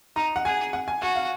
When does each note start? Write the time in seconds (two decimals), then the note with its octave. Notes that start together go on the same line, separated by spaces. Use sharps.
0.16 D#4 A#5
0.36 F#5
0.45 G#4 G#5
0.73 F#5
0.88 G#5
1.02 F#4 G#5
1.16 F5